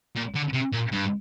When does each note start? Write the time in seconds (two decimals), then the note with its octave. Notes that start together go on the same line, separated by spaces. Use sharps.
0.16 A#2
0.35 D3
0.53 C3
0.72 A#2
0.92 G2